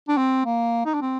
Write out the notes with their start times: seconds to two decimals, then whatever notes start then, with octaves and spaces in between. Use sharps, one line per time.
0.08 D4
0.17 C4
0.45 A#3
0.85 D#4
0.94 D4
1.01 C4